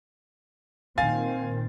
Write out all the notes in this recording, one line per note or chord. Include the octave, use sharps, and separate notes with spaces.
A#2 D#3 C4 F5 G#5 A6